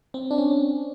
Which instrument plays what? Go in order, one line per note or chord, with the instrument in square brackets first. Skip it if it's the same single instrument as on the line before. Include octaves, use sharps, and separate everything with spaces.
[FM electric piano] C4
D4
C#4